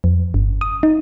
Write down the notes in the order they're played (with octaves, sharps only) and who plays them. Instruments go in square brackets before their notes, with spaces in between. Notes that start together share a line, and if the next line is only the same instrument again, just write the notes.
[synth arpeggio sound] F2
G1
D#6
D#4